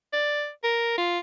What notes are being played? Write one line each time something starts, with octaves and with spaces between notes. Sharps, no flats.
D5
A#4
F4